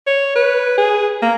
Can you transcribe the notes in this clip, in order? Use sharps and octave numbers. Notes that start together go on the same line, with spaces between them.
C#5
B4
G#4
A#3